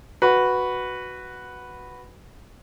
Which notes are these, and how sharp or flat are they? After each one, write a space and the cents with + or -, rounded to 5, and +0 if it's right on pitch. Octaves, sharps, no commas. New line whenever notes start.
F#4 +0 B4 +0